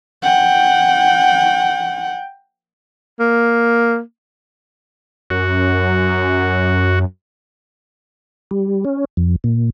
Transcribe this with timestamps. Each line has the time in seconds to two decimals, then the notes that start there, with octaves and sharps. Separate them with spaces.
0.23 F#5 G5
3.20 A#3
5.30 F#2 F#4
8.51 G3
8.85 C#4
9.17 F2
9.44 A#2